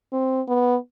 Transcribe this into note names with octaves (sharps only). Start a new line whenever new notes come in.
C4
B3